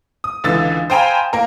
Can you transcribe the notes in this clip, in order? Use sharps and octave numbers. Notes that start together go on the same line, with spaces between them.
D#6
C#2 D3 E3 E6 A6
C5 F5 G5 G#5 A#5 B5
A#3 A#4